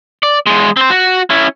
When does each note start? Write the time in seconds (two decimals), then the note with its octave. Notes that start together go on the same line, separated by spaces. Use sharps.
0.23 D5
0.46 E2 G#3
0.77 C4 C5
0.90 F#4
1.30 C#4 E4